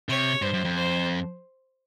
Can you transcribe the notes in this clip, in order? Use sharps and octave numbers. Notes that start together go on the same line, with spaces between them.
C3 C#5
G2 C5
F#2
F2
C5